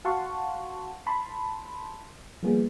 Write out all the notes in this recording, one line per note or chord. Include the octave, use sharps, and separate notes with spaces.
F#4 F5 F#5 A5 C6 C#6
A5 B5 C6
F3 G3 A#3 B3 G#4